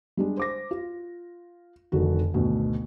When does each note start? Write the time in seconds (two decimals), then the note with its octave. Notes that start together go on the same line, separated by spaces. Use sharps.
0.17 G3 G#3 D4
0.37 C5 D6 A#6
0.71 F4
1.92 F1 D3 D#3 F#4
2.34 G#1 D2 B2